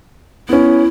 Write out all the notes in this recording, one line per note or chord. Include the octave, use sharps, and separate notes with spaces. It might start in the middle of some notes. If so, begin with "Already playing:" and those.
B3 C#4 E4